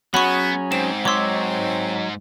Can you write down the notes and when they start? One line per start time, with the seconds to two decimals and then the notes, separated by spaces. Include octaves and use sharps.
0.14 F#3 B3 C#4 F#4 G#4 B5 C#6
0.72 G#2 C4 E7
1.05 F#3 C#5 C6 D6 E6